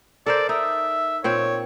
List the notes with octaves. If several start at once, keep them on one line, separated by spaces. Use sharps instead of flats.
A4 A#4 C5 D5
D#4 E5
A#2 C4 C#5 G5